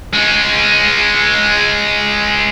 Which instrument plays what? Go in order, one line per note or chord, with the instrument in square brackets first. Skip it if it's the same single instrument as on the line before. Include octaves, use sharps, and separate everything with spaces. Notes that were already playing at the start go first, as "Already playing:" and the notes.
[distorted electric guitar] G#3 C#4